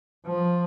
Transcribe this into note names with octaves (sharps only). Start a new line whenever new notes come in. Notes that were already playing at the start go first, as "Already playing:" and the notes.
F3